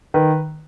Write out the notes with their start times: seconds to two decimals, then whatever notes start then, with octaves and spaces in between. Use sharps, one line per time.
0.14 D#3 B4